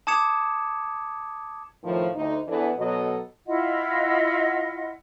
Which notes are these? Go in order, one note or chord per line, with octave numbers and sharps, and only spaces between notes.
A5 D6 D#6 G#6 C#7 E7
A2 D#3 F3
D2 D#4
E2 E3 B3 D4 A4
B2 F#3 A4 D#5
E4 F4 D#5 F#5